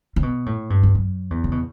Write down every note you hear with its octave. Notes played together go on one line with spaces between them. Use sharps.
C#3
B2
A2
G2
E2
F#2
E2
C#3
B2